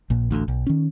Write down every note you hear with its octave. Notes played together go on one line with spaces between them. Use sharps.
A#1 A#2
A1 D2
B1
D#3 C#4